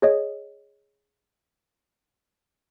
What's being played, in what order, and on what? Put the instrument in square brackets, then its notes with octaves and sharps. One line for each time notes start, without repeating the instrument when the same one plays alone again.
[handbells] G#4 C#5 D#5